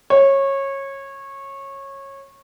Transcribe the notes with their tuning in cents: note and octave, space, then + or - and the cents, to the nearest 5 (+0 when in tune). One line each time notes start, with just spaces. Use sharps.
C#5 -20